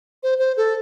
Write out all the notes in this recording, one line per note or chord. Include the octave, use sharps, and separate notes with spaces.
C5
C5
A4